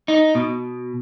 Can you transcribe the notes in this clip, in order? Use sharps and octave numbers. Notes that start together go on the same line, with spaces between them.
D#4
B2